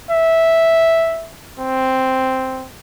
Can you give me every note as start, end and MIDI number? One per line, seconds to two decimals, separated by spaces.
0.11 1.30 76
1.60 2.67 60